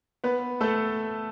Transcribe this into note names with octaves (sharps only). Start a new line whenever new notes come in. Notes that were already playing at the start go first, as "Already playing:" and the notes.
B3 B4
A3 A4